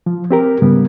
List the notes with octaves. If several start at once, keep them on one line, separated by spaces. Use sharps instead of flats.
F3
C4 G4 A#4
G#2 C#3 G3 B3